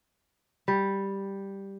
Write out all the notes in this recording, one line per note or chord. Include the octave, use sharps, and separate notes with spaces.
G3